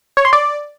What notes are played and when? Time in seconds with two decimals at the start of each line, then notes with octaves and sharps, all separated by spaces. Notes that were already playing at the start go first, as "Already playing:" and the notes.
0.17 C#5
0.25 C6
0.33 D5